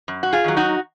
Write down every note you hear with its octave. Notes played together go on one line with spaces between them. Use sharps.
F#2
F#4
F4 G#4
D#3 F#3
D#4 F#4